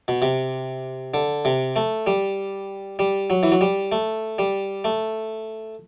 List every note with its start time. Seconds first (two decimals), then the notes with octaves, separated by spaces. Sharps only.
0.08 B2
0.22 C3
1.14 D3
1.45 C3
1.76 A3
2.07 G3
2.99 G3
3.30 F#3
3.43 E3
3.52 F#3
3.61 G3
3.92 A3
4.39 G3
4.84 A3